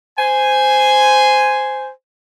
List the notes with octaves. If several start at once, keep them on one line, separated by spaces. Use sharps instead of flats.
C5 G#5